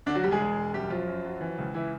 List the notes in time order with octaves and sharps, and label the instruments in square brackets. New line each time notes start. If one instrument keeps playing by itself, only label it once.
[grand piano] D2 D3 D4
F#3 F#4
E1 G3 G4
G#3 G#4
E1
E1
F#2 G3 G4
F3 F#3 F4
F#2
F#3
E3
C#2
E3 E4